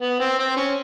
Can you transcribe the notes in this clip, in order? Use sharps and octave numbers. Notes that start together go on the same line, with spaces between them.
B3
C4
C4
C#4